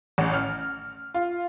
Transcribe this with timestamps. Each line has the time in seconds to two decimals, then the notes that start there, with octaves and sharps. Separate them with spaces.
0.18 A1
0.33 F6
1.14 F4